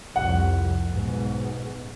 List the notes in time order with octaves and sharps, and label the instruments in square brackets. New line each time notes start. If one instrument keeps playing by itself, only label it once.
[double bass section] C2 F2 [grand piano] F#5
[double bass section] B1 G#2 B2